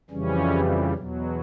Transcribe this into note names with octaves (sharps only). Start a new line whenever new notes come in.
F2 C#3 E3 G3 C#4
E2 B2 F#3